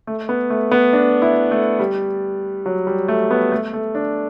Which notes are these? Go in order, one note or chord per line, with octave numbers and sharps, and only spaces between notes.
A3
B3
A3
B3
D4
E4
A3
G3
F#3
G3
A3
B3
A3
A3
D4